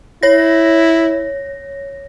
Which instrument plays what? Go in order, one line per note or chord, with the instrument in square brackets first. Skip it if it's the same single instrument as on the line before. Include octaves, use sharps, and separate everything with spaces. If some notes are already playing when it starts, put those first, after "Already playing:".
[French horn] E4 [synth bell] C#5 A#6